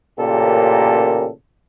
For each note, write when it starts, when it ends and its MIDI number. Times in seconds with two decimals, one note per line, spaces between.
0.19 1.28 33
0.19 1.28 46
0.19 1.28 49
0.19 1.28 67
0.19 1.28 69
0.19 1.28 70